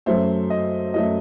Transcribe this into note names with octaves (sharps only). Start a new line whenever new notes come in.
F#2 F#3 A3 C5
D#5
F#2 F#3 A3 D#5